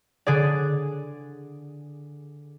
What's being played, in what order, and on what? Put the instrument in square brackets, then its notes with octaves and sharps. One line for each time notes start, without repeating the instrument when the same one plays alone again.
[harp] D3 G#4 D5